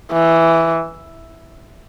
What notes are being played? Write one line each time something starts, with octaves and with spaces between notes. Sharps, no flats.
E3